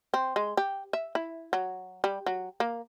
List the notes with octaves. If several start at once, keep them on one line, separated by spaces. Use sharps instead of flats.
C4
G#3
G4
E5
E4
F#3
G3
F#3
A#3